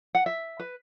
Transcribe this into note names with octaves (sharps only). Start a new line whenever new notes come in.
F#5
E5
B4